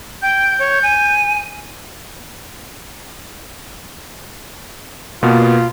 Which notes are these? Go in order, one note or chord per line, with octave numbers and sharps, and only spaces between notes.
G5 G6
C#5
G#5
B2 A#3 B3 F4